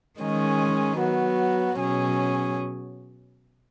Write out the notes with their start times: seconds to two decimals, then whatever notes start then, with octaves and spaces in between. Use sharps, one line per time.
0.19 D#3 G#3 C#4 G#4
0.98 F#3 B3 F#4
1.76 B2 F#3 C#4 G#4